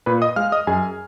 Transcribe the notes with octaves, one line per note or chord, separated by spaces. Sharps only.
A#2 B4 B5
D#5 D#6
G#3 F5 F6
D#5 D#6
F#2 G#4 G#5